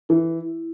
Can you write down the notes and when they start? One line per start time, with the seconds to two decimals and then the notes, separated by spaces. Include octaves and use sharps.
0.09 E3 E4